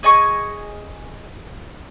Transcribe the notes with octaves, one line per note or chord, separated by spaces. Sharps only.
G#4 D#5 G#5 C#6